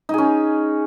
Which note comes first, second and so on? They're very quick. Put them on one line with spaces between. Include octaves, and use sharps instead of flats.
D#4 G#4 C#4